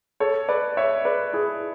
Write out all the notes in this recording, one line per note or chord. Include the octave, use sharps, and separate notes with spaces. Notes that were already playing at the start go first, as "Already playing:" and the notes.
A4 C#5
B4 D5
C#5 E5
B4 D5
E4 G#4